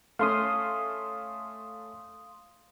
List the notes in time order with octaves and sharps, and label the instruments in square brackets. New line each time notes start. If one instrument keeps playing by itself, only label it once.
[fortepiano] A3 C#4 [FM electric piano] F5 C6 D#6